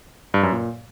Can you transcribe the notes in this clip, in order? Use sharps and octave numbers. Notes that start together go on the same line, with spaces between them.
G2
F#2
A#2